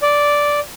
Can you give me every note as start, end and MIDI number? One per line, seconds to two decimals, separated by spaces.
0.02 0.60 74